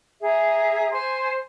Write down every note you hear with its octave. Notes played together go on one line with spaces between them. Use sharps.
G#4 E5 A#5
C5 G#5 C6